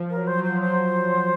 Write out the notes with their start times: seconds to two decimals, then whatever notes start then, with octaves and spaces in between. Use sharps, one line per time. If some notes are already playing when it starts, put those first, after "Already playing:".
Already playing: F3
0.10 A#4
0.15 F#3
0.27 C5
0.38 F#3
0.44 C5
0.50 F3
0.61 F#3 C5